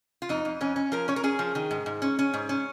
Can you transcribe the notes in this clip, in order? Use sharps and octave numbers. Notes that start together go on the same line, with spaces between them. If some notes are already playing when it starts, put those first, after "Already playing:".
F4
F2 D#4
F2
F2 C#4
C#4
F3 A#4
C#4 C#5
A#4
C#4 G#4
F3
D#3
G#2
G#2
C#4
C#4
G#2
C#4